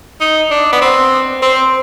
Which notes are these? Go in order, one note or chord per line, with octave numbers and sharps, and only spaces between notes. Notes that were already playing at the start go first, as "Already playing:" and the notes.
D#4
D4
B3
C4
C4